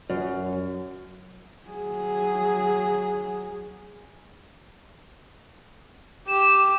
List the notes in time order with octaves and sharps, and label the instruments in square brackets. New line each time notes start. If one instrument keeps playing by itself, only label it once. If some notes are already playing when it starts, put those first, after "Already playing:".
[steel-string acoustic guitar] F#2
[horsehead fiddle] F#3 G#4
[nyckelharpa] G4 [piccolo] E7